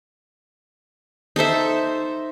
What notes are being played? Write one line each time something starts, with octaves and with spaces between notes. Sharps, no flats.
D#4 A4 C5 E5